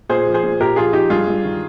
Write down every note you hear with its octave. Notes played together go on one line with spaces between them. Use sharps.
A#2 G#4 C5
F3
G#4 C5
A#2
A#2 G4 A#4
F3 F4 G#4
F3 D#4 G4
G2 F4 G#4
G2
D#3